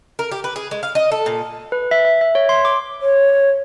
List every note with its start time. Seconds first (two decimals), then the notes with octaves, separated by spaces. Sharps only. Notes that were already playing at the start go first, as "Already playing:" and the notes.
0.19 A#4
0.31 G4
0.44 B4
0.56 G#4
0.71 G#3
0.83 F5
0.95 D#5
1.12 A4
1.26 A#2
1.72 B4
1.91 E5
2.05 E5
2.21 E5
2.35 C#5
2.49 C6
2.65 D6
3.01 C#5